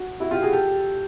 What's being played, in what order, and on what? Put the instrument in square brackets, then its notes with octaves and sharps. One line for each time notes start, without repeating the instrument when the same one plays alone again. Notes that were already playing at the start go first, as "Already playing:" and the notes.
Already playing: [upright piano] F#4
E4 F#4
F4 G4
F#4 G#4
G4 A4